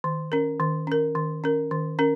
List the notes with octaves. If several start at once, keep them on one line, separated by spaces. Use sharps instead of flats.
D#3
C#4 A#4
D#3
C#4 A#4
D#3
C#4 A#4
D#3
C#4 A#4